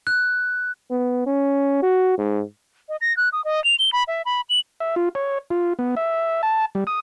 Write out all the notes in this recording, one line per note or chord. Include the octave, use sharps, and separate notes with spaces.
F#6
B3
C#4
F#4
G#2
D#5
A#6
F#6
D#6
D#5
F7
G7
B5
E5
B5
F#7
E5
F4
C#5
F4
B3
E5
A5
G3
D#6